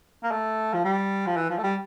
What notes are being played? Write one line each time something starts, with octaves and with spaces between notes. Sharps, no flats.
A#3
A3
F3
G3
F3
E3
F3
A3
G3